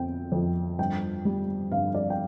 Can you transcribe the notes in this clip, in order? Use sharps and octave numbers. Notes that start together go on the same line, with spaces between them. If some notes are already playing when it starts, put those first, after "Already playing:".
Already playing: F2 C4 G5
F2
G2 G5
G3
G2 F5
D5
G5